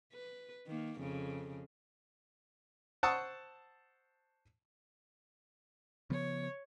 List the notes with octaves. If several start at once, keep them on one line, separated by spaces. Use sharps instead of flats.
B4
D#3 A#3
F2 C#3
C5 F#5 A5 C#6 D#6 E6
C#3 F3 B3 C#5